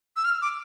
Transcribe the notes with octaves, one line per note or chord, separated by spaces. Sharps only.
E6
F6
D6